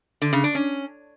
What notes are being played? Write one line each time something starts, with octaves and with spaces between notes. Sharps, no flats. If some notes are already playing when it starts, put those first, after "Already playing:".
D3
C#3
D4
C#4